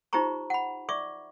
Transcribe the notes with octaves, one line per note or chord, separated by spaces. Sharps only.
D#4 F4 G4 C5 A#5 C#6
F#5 B5
D5 E5 C#6 D6